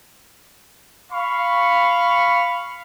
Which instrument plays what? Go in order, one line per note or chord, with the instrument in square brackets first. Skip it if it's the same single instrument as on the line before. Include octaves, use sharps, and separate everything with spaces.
[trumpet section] F5 B5 C#6